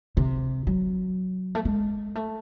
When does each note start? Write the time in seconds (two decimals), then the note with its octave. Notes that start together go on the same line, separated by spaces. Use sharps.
0.17 C3
0.67 F#3
1.55 A3
1.65 G#3
2.15 A3